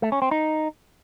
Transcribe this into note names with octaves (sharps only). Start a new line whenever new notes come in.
A3
C#4
C4
D#4